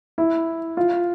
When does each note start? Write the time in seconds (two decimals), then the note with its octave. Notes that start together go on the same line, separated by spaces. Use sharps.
0.18 E4
0.77 F4